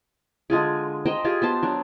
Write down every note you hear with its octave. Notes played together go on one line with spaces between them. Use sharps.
D3 G#3 F4 G#4
C5 D#5 G5 A#5
F4 G4 G#4
B3 C5 A5
F#3 D4